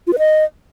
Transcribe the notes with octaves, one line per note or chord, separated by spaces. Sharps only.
F4
B4
D#5